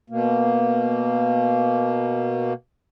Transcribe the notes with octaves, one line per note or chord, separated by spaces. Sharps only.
B2 A#3